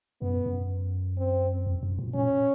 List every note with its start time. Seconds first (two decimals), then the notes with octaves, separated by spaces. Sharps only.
0.22 F#2 B3
0.46 F#2
1.18 C4
1.66 F2
1.83 F#2
1.99 A#2
2.14 A#2 C#4